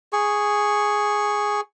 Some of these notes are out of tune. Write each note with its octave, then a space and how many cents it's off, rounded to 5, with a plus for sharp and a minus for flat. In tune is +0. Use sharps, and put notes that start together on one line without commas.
G#4 +0 C#6 +0